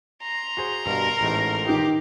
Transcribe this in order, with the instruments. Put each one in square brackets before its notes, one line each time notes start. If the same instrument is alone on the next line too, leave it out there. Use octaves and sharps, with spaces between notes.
[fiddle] A#5 C6
[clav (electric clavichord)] F#4 G#4 C5
[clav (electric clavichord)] G2 B2 [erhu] A#4
[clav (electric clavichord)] A1 G#2 A3
[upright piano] D#3 D#4 [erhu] G4